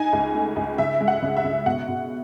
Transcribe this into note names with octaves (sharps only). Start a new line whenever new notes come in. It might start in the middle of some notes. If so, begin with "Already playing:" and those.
Already playing: D#4 G#5
C#2
A3
C#2
C#3 E5
G#3
F#5
C#3
E5
C#3
B2 F#5
B2